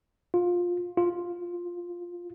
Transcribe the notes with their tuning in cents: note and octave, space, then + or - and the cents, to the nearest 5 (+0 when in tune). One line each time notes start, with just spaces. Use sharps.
F4 +15
F4 +5